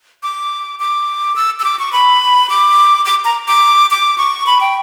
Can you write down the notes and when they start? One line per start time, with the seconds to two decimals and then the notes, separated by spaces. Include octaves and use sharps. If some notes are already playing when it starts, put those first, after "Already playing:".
0.23 D6
0.79 D6
1.36 E6
1.60 E6
1.64 D6
1.79 C#6
1.93 B5
2.49 D6
3.05 D6
3.25 A#5
3.48 D6
3.91 D6
4.18 C#6
4.46 B5
4.61 G5